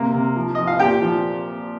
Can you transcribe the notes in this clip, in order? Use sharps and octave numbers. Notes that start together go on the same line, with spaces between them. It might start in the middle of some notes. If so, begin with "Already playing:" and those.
Already playing: C3 A#3 A#4
C3
F3
F3 D#5
F5
A#2 G4 G5
F3